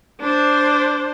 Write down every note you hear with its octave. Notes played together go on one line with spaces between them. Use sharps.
D4 C5